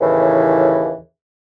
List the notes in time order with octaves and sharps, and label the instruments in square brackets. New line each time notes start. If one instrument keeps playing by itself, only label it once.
[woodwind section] D#2 A2 C#3 E3